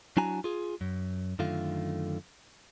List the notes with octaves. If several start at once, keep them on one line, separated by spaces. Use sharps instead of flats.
F#3 D4 E4 F#4 G#5 A#5
F4 G#4
F#2
F#2 D3 D#3 A3 F4